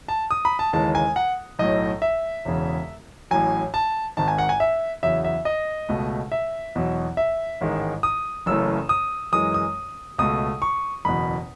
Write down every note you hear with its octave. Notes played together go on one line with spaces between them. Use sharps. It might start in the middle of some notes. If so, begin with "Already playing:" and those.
A5
D#6
B5
A5
D#2 C#3 E3 G#3 A5
G#5
F#5
B1 A2 F#3 A3 D#5
E5
E1 E2 C#3
A1 A2 F#3 G#5
A5
G#1 G#2 D#3 A5
G#5
F#5
G#5
E5
E2 C#3 F#3 E5
E5
D#5
C#2 B2 A3
E5
E2 B2 F#3
E5
A1 G#2 D#3 G#3
D#6
F#1 F#2 C#3 E3 A3 E6
D#6
F#2 E3 G#3 D#6
D#6
C#2 B2 A3 D#6
C#6
F#1 E2 B2 B5